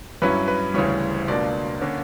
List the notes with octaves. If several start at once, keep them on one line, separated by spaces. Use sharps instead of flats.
G2 F#3 C#4 E4 B4
B4
D2 C#3 E3 G3 C#5
C#2 B2 A#3 D4 D5
D3 A#3 C#4